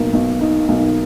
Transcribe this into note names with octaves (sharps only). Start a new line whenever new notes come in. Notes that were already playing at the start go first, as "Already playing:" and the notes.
Already playing: B1 A#3
B1
D#4
B1